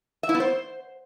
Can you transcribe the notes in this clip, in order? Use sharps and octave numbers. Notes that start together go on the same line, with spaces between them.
E5
E4
B3
C5